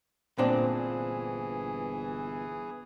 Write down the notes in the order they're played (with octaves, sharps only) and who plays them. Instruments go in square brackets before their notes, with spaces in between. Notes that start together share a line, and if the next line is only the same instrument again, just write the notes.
[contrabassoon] G1 [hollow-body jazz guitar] A#2 C4 D4 [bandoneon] E3 G#4 [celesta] C5